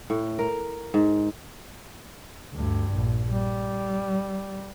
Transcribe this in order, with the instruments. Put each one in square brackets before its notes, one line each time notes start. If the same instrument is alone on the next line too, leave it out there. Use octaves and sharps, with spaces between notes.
[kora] A2
A#4
G#2
[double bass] D2 G2
A#1
G3